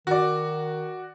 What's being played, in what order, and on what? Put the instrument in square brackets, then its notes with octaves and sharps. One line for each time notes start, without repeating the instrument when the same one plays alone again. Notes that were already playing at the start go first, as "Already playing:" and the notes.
[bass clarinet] D#3 [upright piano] F#4 D5